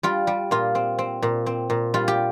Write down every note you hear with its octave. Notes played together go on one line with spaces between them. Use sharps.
G3 F4
G3
A#2 F4
C4
C4
A#2
C4
A#2
G3 F4
G4